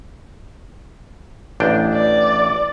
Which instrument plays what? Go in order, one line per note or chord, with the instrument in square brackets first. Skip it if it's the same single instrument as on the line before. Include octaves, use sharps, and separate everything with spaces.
[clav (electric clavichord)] A1 D4 G5
[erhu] D5